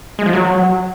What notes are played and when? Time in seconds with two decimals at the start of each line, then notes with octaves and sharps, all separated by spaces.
0.19 G#3
0.26 F3
0.33 F#3